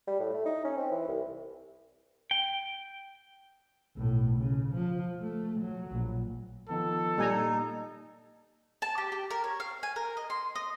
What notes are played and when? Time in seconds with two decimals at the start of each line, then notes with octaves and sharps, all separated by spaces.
0.07 G3
0.20 A2
0.34 A3
0.46 D#4
0.65 C#4
0.77 C4
0.91 E3
1.08 C2
2.31 G5
3.97 B1 A2
4.37 C#3
4.74 F3
5.20 A3
5.60 F#3
5.91 A#1
6.69 D#3 F3 B3 A4
7.18 A#2 G3 D#4 G#5 A#5
8.82 A5
8.98 G4
9.12 G4
9.31 A#4
9.44 C#5
9.60 F5
9.83 G#5
9.96 A#4
10.17 D#5
10.30 C6
10.55 D#5